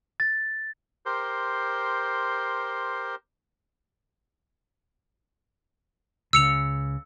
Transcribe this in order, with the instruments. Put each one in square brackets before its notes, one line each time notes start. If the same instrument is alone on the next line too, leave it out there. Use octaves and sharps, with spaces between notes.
[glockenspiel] A6
[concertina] G4 A#4 C5 C6
[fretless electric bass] C#2 C#3 [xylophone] E6 C#7 F7